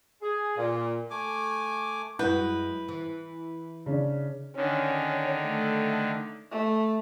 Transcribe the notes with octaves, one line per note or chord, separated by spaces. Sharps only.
G#4
A#2
A3 G#5 D6
F#2 G#3 E4 F#4 B4 G6
E3
C#3 D4
D3 D#3 C#4
A3
A3